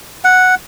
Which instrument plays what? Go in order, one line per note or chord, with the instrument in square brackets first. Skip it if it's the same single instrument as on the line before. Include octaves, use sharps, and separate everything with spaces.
[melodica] F#5